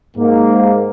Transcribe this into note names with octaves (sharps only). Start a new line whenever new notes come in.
G#2 A#3